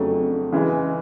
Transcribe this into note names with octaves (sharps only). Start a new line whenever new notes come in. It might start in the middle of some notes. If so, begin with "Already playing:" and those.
Already playing: F2 C#3 F#3 A3 D4
C#3 E3 G#3